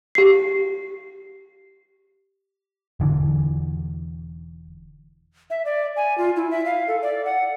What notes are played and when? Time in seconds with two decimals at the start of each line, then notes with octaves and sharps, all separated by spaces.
0.15 G4 C7
3.00 E1 D3 E3
5.50 E5
5.65 D5
5.97 G#5
6.18 F4
6.36 E4
6.51 E5
6.66 F5
6.88 A4
7.02 D5
7.25 F#5